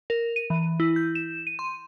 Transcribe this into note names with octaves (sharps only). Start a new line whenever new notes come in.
A#4
D#7
E3
E4
G6
E7
D#7
C6